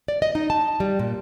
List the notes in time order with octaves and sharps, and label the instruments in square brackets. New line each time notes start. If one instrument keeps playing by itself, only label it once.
[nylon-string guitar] D5
D#5
D#4
A5
G3
A#2